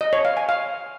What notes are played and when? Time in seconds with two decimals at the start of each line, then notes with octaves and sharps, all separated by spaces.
0.01 D#5
0.13 C#5
0.25 F5
0.37 G#5
0.49 F5